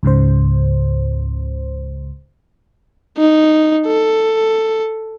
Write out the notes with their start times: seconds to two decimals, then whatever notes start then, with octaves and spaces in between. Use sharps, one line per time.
0.03 C#2 G#2 C#3 C5
3.18 D#4
3.87 A4